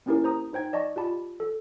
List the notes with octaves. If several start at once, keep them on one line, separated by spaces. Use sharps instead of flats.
A#3 C4 C#4 E4 G4 A#4
C5 A#5 D#6
D#4 C5 G5 G#6
D5 D#5 A5 C#6
F4 G4 A5 B5
A4